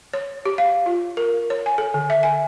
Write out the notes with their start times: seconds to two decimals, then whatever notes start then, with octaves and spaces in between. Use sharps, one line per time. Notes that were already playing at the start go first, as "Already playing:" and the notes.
0.13 C#5
0.45 G4
0.58 F5
0.86 F4
1.17 A#4
1.50 C#5
1.66 G#5
1.78 A4
1.94 D3
2.10 E5
2.23 G#5